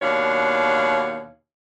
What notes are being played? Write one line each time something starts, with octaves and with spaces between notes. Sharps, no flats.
D#2 B2 D4 C#5 F5